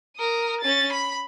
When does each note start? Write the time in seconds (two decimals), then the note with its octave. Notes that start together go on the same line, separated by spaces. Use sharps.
0.17 A#4 D#6
0.61 C#4 A6
0.92 B5